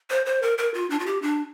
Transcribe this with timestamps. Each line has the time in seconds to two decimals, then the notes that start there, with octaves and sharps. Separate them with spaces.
0.10 C5
0.26 C5
0.42 A#4
0.58 A#4
0.74 F4
0.90 D4
0.99 F4
1.06 G4
1.22 D4